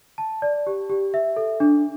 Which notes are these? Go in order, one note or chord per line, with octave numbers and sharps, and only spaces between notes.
A5
D5
G4
G4
E5
A4
D4